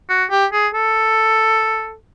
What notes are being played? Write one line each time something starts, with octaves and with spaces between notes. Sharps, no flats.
F#4
G4
G#4
A4